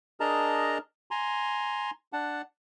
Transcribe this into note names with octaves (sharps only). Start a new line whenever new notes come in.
D4 G#4 A#4 D#5 A5 A#5
G#5 A#5 C6
D4 F#5 A5